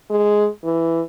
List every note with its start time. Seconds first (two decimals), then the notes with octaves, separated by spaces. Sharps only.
0.10 G#3
0.64 E3